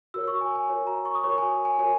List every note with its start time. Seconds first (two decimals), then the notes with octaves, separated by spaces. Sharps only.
0.14 F#4 A#4 C#5 E6
0.27 C#6
0.41 G#5
0.55 G#5
0.69 F#4 A#4 C#5
0.87 A#5
1.05 C#6
1.15 D#6
1.23 F#4 A#4 C#5 C#6
1.38 G#5
1.65 G#5
1.79 F#4 A#4 C#5 G#5